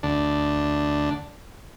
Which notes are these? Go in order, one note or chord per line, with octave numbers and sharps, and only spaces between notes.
D2 D4